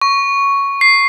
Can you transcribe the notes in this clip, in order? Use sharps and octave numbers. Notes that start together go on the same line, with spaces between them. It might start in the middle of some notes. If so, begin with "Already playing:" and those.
C#6
C7